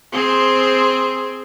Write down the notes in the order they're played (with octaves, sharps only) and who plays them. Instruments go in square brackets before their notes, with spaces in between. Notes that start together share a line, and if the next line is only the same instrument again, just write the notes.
[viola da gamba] C4 G#4 C5